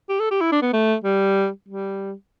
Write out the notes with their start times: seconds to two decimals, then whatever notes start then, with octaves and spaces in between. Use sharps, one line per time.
0.09 G4
0.20 A4
0.31 G4
0.41 E4
0.52 D4
0.62 B3
0.73 A3
1.04 G3
1.68 G3